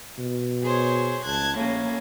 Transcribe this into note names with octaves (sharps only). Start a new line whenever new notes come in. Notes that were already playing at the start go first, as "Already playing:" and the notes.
B2
G#4 C5 C#5
C#2 A5 F#6 G#6
A#1 A2 A#3 C#4